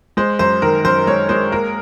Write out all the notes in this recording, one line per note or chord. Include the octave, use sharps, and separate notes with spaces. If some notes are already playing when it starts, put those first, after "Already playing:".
G#3 C5
F#2 C5
D#3 A#4
F#2 C5
G#3 C#5
G#3 C5
A#3 A#4